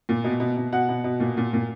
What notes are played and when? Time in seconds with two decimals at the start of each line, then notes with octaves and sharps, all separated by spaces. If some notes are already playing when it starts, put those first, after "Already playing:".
0.09 A#2
0.24 B2
0.40 B2
0.57 B2
0.72 B2 F#5
0.89 B2
1.04 B2
1.20 A#2
1.37 A#2
1.53 A#2